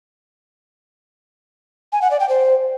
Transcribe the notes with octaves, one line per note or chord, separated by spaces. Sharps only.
G#5
F#5
D5
G5
C5